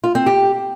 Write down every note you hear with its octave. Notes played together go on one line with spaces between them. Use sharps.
F4
C4
G4